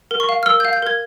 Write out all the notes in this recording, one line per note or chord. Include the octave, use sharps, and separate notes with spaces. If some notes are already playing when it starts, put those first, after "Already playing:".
A#4
C#6
F5
F6
A#4 E6
G6
F5
G6
A#4 G#6